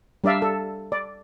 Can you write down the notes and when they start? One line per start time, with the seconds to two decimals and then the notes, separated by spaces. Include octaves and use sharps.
0.24 G3 D4 D5 E5 F5
0.42 A4
0.92 D5